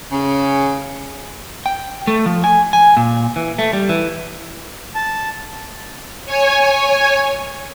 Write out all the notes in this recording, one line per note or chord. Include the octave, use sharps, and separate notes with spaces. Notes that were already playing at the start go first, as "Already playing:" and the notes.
C#3
G5
A3
F3
G#5
G#5
A#2
E3
A3
G3
E3
A5
C#5 G#5